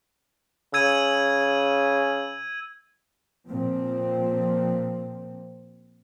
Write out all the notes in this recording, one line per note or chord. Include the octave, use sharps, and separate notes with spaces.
C#3 E6 G#6 D#7
A#2 F3 C4